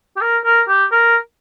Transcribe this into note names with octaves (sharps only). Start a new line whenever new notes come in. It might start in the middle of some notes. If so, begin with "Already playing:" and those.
G4
A#4
A#4
G4
A#4